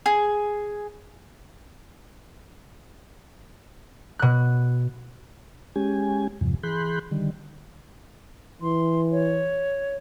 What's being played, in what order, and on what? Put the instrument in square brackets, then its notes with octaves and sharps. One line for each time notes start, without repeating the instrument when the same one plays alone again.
[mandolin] G#4
[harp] B2 F#6
[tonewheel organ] G#3 C#4 G4 G#5
E2 G2 C3 F3
E3 G#4 B5 C6 F#6 G6
D3 D#3 G3
[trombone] E3 [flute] C6
[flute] C#5